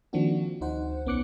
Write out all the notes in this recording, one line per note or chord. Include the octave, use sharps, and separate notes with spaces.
D#3 F3 A#3 C4 D4 F#4
D2 D#4 C5 F#5
B1 B3 C#4 D6 F#6 C#7